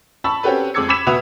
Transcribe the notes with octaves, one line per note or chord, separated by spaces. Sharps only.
A5 B5 C#6 E6
C4 C#4 F#4 G4 A4 B4
F2 G#3 D6 E6 G#6 C#7
B5 D6 E6 G#6 B6 E7
B2 F#4 B4 E5 D#6 F7